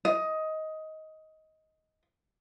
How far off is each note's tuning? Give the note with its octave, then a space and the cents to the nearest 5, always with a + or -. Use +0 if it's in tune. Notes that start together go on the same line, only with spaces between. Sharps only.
D#5 +15